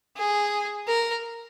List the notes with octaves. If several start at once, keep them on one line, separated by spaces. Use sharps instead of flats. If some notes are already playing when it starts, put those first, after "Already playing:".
G#4
A#4